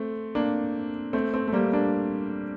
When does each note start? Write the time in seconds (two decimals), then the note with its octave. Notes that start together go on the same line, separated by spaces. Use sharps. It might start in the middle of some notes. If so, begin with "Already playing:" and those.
Already playing: A3 C4
0.35 A#3 D4
1.13 A3 C4
1.34 A3 C4
1.48 A3
1.52 G3 A#3
1.73 A#3 D4